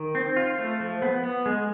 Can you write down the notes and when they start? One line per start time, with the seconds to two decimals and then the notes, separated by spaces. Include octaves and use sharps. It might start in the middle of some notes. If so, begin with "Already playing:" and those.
Already playing: D#3
0.15 C4
0.37 F4
0.58 A3
0.80 F3
1.02 B3
1.24 B3
1.46 G#3